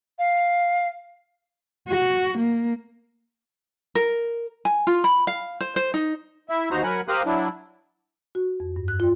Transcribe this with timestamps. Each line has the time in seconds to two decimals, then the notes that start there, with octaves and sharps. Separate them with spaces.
0.19 F5
1.88 F#4
2.38 A#3
3.95 A#4
4.65 G#5
4.87 F4
5.04 B5
5.27 F5
5.60 C5
5.76 C5
5.94 D#4
6.49 E4 E5
6.71 D#2 D#4 F#4 C5 A#5
6.84 F#3 A#4 F#5 G#5 B5
7.08 G4 A#4 C5 F5 D#6 F#6
7.26 F#3 D4 E4
8.35 F#4
8.60 F2
8.76 G2
8.88 F#6
9.00 F4